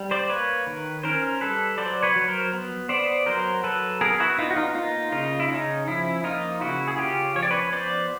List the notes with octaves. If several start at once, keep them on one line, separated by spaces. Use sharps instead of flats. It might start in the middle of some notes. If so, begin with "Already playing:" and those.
Already playing: G3
C5 D5
A#3 B4 C#5
D#3
C#4 A#4 C5
G3 A4 B4
F#3 C5 D5
B4 C#5
F#3
A#4 C5
B3
B3 C5 D5
F#3 A#4 C5
F#3 A4 B4
B3 G#4 A#4
E4 F#4
B3 D#4 F4
F#4
D#4 F4
A#3 D#4 F4
C#3 D#4 F4
E4
C#4 D#4
F3 E4
A#3 D#4 F4
C#3 E4 F#4
G#4
C#4 F4 G4
F3 C#5
D5
B4 C#5
B3 C5 D5